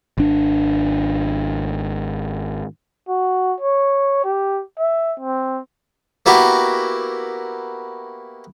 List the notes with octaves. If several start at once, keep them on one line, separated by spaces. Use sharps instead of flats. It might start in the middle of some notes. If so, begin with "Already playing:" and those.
G#1 D4
F#4
C#5
G4
E5
C4
A#3 B3 E4 F#4 G4